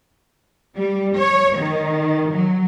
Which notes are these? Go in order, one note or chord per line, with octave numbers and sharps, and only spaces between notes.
G3
C#5
D#3
F#3